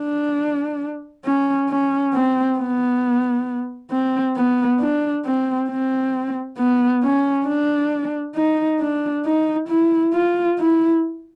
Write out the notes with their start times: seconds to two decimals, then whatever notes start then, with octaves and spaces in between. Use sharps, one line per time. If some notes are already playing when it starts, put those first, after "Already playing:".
Already playing: D4
1.25 C#4
1.69 C#4
2.14 C4
2.59 B3
3.91 C4
4.36 B3
4.80 D4
5.25 C4
5.70 C4
6.58 B3
7.03 C#4
7.47 D4
8.36 D#4
8.80 D4
9.26 D#4
9.69 E4
10.14 F4
10.59 E4